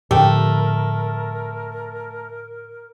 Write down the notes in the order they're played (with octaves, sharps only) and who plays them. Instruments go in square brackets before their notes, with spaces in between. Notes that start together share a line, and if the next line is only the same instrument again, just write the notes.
[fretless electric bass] A2 D3 F3 [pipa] A3 [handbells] G4 G5 [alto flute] A#4